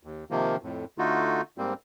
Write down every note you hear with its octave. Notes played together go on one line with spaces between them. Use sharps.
D#2
C3 D#3 F3 A#3
F2 A2
D3 A3 D#4 F4 F#4
G#2 G3 A#3 C4